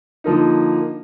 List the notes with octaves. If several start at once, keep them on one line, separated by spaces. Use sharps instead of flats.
D3 F3 A#3 D#4